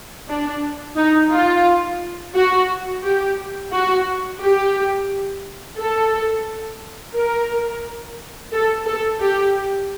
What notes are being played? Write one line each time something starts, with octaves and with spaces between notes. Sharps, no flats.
D4
D#4
F4
F#4
G4
F#4
G4
A4
A#4
A4
A4
G4